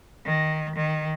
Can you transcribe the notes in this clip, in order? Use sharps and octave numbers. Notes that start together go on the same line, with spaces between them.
D#3
D#3